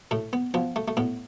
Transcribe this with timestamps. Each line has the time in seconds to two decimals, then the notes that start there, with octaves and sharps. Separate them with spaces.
0.11 A2 A3
0.33 B3
0.54 F3 B3
0.76 A3
0.88 A3
0.97 A2 B3